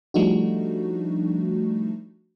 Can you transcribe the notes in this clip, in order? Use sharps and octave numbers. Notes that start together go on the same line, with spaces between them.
F3 G3 A3 D4 D#4 F#4